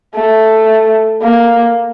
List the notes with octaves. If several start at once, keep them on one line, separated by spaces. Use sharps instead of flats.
A3
A#3